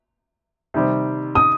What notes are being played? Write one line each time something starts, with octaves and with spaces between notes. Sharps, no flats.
C3 D#3 G3 C4
D#6